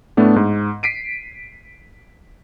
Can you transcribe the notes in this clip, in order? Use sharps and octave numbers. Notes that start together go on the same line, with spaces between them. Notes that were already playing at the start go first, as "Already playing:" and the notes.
A2 A3 B3 D4
G#2
B6 C7 D7 D#7